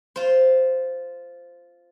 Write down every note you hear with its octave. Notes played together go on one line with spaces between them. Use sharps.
F4 C5